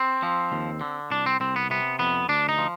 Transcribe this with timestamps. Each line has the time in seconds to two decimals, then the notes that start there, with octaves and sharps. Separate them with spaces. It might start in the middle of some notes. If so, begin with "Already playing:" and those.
Already playing: C4
0.23 F3
0.52 D#2
0.81 D3
1.11 C2 D4
1.26 C4
1.40 C2 C4
1.56 B3
1.70 C3 B3
1.99 F2 B3
2.29 D2 D4
2.49 D#4
2.58 F3